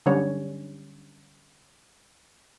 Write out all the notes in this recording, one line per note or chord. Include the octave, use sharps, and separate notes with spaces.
D3 F#3 G3 C#4 C#5